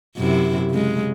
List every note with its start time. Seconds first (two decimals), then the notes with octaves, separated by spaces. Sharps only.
0.17 F#2 C3 E4
0.70 C#3 G#3